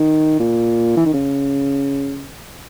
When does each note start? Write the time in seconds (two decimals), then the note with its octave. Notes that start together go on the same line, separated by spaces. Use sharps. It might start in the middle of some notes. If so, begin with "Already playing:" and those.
Already playing: D#3
0.39 A#2
0.96 E3
1.06 D#3
1.14 C#3